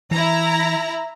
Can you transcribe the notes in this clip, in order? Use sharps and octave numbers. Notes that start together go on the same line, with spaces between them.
E3 E4 A#5